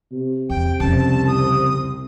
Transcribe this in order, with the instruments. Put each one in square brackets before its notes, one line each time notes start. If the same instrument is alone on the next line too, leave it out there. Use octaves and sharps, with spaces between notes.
[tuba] C3
[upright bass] E2 [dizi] G5
[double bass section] C2 C4 [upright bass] F2 C#3 [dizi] A5
[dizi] D#6